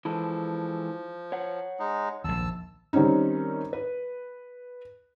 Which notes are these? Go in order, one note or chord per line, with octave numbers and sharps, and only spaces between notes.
E3 F3 G#3 A4
C#5 F#5
G#3 D#4
A#1 D#2 A5 E6
D#3 G3 C4 C#4 D#4
B4